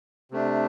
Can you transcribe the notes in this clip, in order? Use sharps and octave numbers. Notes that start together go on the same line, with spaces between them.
C3 A3 D4